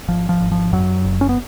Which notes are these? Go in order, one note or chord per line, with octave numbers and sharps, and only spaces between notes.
G#1 F3
F3
G#1
F3
F#2 F#3
F#1
C#4
B3